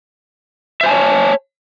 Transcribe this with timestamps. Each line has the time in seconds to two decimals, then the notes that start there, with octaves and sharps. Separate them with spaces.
0.81 E5
0.83 C5
0.86 G#5
0.89 A5
0.91 C#5